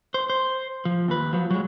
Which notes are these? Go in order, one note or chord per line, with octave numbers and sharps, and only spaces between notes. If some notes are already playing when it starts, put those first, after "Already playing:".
C5
C5
F3
D#2 B4
F3 F#3
F#3 G#3